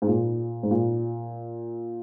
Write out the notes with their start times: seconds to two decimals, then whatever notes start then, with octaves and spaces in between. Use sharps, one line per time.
0.02 G#2
0.08 A#2
0.63 G#2
0.71 A#2